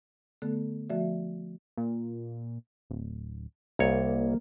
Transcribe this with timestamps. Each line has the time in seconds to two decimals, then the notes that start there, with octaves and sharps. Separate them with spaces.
0.42 D3 A3 B3 A4
0.90 F3 A3 F#4 D5 E5
1.77 A#2
2.90 D1
3.79 C2 A#3 C#5